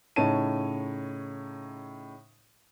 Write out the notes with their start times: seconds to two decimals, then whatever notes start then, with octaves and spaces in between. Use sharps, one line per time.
0.16 A2 C#3 D#4 C#5 A5 D#7